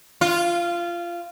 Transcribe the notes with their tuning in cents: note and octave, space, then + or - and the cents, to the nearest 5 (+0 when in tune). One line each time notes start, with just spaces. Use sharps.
F4 -15